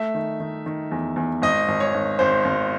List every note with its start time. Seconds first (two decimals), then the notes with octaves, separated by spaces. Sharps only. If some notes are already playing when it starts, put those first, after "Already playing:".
Already playing: A3 E5
0.14 D#3
0.40 D#3
0.66 D#3
0.92 E2
1.16 E2
1.42 G#1 D#5
1.68 G#1
1.80 C#5
1.94 G#1
2.19 G#1 C5
2.45 G#1